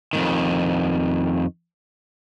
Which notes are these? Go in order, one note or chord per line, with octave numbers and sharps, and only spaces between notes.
F2 G#2 D#3